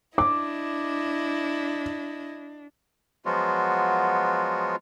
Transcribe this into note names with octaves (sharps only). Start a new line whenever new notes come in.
D4 E4 D#5 D6
F3 F#3 G#3 B3 F4 F#4